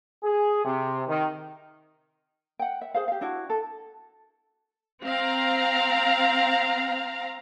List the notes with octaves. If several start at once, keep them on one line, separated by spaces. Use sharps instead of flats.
G#4
C3
D#3
F#5 G5
E5
G#4 C5 F5
G4 F5
D4 E4 F#4
A4
C4 F5 A#5